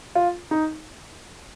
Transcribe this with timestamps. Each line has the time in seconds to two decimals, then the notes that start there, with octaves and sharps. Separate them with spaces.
0.15 F4
0.51 D#4